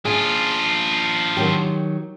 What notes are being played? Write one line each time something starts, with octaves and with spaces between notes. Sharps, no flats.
D4 F4 G#4
D#3 F#3 G4